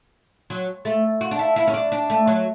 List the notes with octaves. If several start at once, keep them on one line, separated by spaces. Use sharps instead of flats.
F#3
A3
F#4
D4
E4
E4
C#4
D4
D4
A3
F#3